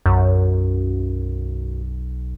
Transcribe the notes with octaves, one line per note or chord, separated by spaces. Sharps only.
B1 F#2